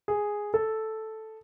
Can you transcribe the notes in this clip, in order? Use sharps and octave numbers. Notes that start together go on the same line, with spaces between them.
G#4
A4